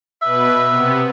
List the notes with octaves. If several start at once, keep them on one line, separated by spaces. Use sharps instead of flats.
B2 B4 E5
C3 B3